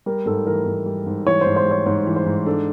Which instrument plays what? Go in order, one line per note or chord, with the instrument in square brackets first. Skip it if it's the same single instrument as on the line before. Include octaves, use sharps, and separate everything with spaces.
[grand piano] G3 [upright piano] A#4
[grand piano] G#2 [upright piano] A4
[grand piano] E3 [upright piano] A#4
[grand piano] G#2
G3
G#2
[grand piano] E3 [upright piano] C#5
[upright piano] C5
[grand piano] G#2
[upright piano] C5
[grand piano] G3 [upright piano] C#5
[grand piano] G#2 [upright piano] C#5
[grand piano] E3
[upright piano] C5
[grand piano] G#2
[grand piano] D4 [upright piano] A4